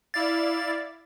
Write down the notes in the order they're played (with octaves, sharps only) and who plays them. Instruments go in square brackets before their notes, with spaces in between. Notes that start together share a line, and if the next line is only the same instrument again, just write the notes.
[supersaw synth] E4 D5 F5 [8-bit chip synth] A6